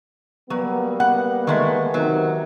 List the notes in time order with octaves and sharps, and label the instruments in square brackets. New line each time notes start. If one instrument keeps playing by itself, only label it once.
[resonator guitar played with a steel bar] F#3 [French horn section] G3 A#3 B3
[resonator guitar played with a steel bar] F#5
D#3 G#3 A3
[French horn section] C3 D#3 [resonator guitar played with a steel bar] F#3